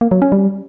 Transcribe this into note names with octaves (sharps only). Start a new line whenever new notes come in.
A#3
F#3
C#4
G3